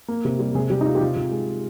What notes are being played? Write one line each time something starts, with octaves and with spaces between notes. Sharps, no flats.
A#3
C3
G3
C3 G#3 G#4
C3 G3 G4
D#4
G#3 F4
G4
C3 F4
C3
G#3